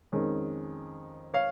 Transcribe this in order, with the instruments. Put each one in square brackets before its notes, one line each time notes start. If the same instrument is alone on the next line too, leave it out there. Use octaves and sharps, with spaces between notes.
[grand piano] F2 D#3 G#3 C#4
C#5 F5